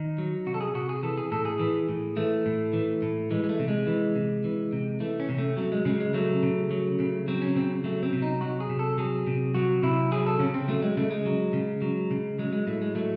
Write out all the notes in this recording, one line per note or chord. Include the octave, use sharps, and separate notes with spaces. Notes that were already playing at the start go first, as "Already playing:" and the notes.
Already playing: D#3 D#4
F#3
C3 F#4
A4
G#4
C3 F#4
G#4
E3 A4
G#4
A2 A4
G#4
E3
A2
E3 A3
A2
E3
A2
E3 G#3
G#3
A3
C3
G#3
E3
C3
E3
C3
E3 A3
C#4
C3
A3
F#3 A3
G#3
C#3 G#3
G#3
F#3 A3
C#3
F#3
C#3
F#3 C4
C#4
C#3 C4
F#3 A3
C4
C3
D#4
F#3 F#4
G#4
C3
A4
F#3 G#4
C3
F#3 F#4
C3 E4
F#3 G#4
A4
C#3 C#4
C4
F#3 A3
G#3
C#3 A3
G#3
F#3
C#3
F#3
C#3
F#3 G#3
G#3
A2 A3
G#3
F#3 A3